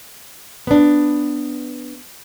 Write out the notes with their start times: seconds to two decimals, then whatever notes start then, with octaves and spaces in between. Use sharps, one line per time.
0.67 B3 D4